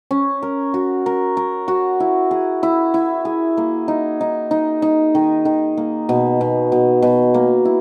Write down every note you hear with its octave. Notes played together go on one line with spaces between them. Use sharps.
C#4
A#4
F#4
A#4
A#4
F#4
E4
G#4
E4
E4
G#4
A#3
D#4
D#4
D#4
D#4
D#3
D#3
A#3
B2
B2
B2
B2
A#3
E4